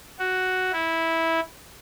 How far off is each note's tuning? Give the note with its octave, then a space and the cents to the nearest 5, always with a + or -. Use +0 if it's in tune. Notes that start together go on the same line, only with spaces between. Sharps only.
F#4 +5
E4 -10